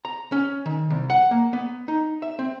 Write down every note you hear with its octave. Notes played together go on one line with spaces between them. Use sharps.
A#5
C#4
D#3
C2
F#5
A#3
B3
D#4
E5
C4